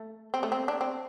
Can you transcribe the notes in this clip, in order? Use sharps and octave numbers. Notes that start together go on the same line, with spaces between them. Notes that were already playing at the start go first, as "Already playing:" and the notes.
Already playing: A3
C4
A3
C4
D4
C4